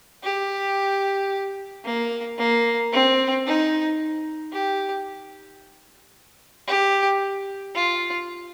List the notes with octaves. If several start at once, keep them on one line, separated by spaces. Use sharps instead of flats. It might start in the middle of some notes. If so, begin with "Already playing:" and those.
G4
A#3
A#3
C4
D#4
G4
G4
F4